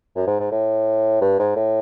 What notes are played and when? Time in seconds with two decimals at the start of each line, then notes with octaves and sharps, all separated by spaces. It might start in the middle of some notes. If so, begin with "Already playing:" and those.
0.16 F#2
0.27 G#2
0.40 G#2
0.51 A2
1.21 G2
1.39 G#2
1.56 A2